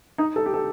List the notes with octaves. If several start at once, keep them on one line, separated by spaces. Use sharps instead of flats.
D#4
A4
G4
A4